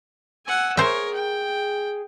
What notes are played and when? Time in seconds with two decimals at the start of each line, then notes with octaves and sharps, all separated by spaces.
0.46 F#5 G#5 E6
0.77 G#4 A#4 C5 C#5 E5
1.14 G5